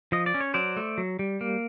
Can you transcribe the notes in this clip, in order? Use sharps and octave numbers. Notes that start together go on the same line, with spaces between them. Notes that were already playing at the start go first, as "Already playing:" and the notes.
F3 D#5
D5
C#4
C#5
F#3 C5 D5
A3
F#3
G3
A#3